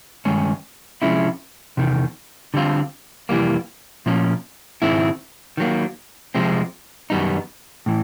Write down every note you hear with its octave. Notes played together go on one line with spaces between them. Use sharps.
G2 D#3 G#3 C#4
C3 F3 G#3 C#4 E4
E2 C3 D#3
D3 G3 C4 F4
F2 C3 E3 G3 A#3
A#2 F3 A#3 C#4
G#2 D#3 G#3 C4 E4
D#3 F#3 A#3
C3 F3 G#3 C4
F#2 D#3 G3 B3 D#4
A2 E3